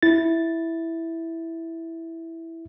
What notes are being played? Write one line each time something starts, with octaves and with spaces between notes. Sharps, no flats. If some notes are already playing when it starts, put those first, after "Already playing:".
E4 A6